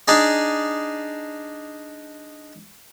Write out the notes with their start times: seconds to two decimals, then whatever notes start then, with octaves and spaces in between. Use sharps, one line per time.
0.08 D4 D#4 G#4 D5